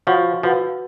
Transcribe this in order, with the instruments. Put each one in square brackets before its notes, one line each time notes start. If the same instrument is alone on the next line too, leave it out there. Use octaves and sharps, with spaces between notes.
[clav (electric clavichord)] F3 [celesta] F#4 C#5 F#5 C#6
[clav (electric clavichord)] F3 [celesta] F#4 B4 F#5